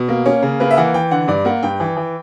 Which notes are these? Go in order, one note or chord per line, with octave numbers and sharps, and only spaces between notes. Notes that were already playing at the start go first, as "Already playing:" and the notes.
Already playing: B2
A#3
A#3 C#4
C#3
A#3 B4
E5
E3 F#5
E3 G5
D3 F#5
G2 D5
A#3 F#5
G2 G5
E3
E3